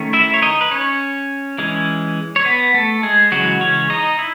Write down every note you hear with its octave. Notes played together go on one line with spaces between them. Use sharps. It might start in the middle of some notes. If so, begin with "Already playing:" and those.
Already playing: D#3 A3 C#4
E4 E5
C#5
D#4 D#5
B4
C#4 C#5
E3 G#3 C#4
C#5
B3 B4
A3 A4
G#3 G#4
C#3 E3 F#3 G#3 F#4
C#4 C#5
D#4 D#5
E4